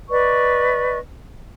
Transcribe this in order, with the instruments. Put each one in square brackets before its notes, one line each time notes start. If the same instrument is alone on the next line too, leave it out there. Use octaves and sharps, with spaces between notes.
[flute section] B4 D5 D#5 C#6